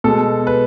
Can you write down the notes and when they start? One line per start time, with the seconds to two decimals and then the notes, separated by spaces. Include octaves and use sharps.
0.04 B2 G#3 A4
0.47 B4